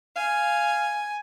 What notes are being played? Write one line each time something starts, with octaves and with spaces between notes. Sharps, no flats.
F5 G#5